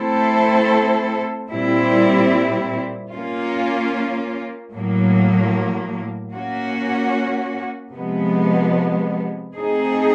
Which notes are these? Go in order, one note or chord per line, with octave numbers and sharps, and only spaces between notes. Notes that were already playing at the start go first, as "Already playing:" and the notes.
Already playing: A3 C4 E4 A4 C5
A#2 G3 C4 E4
A#3 C#4 F4
A2 F#3 A#3
A#3 C#4 F#4
C3 F3 G#3 B3
A3 C4 D#4 G#4